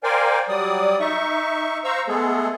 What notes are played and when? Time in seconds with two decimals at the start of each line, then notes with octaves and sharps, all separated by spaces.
0.03 A#4 C5 D5 F5 G5 G#5
0.49 F#3 G3 D5 D#6
1.00 D#4 E5 C#6
1.84 C5 F5 A#5 C#6 E6
2.08 G#3 A3 B3 G#4 A4